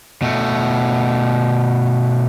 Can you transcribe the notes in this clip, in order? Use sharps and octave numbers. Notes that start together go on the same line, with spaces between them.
B2 A3